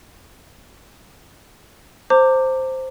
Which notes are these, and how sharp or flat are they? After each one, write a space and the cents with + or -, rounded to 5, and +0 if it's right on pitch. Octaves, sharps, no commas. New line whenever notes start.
C5 +0 A#5 -35 D6 +0